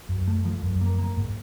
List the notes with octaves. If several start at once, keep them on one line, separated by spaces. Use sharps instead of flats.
F#2
A3
F3
F#2
A#3
A#3
G#2